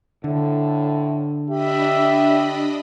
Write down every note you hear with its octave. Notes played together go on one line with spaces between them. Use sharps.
A2 D3
D4 G4 D#5 E5 B5